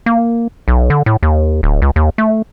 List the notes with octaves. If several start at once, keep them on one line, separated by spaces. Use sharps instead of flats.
A#3
B1
D3
A2
D#2
D1
C#2
D#2
A3